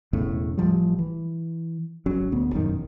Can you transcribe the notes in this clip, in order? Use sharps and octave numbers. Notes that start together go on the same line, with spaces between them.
E1 E2 A2 C#3
A1 C#3 F3 G3
E3
G#1 F#3 C#4
D1 D2 B3
E1 A1 F#2 D#3